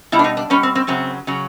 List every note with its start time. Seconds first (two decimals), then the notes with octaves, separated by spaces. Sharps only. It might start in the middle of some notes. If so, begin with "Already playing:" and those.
0.12 B2 G3 E4
0.19 D4
0.24 D#4
0.37 D4
0.50 B2 G3 C#4
0.63 C4
0.75 C4
0.87 F#2 C#3 F#3 C4
1.27 C#3 F#3